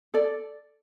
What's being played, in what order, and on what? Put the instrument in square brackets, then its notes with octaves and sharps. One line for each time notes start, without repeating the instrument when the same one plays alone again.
[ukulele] A4 D5